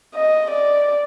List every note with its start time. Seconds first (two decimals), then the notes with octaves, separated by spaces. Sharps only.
0.14 D#5
0.51 D5